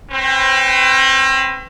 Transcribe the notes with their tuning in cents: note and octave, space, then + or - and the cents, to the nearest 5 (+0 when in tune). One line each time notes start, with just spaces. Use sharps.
C4 +40 B4 +45 G5 -10